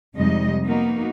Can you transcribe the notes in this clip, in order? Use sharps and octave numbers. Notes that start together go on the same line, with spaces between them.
F2 C3 G3 G#3 D#4 D#5
A#3 B3 D#4 F#4